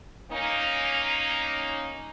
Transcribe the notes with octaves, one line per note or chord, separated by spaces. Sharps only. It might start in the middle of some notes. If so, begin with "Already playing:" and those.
A#3 C#4 D#4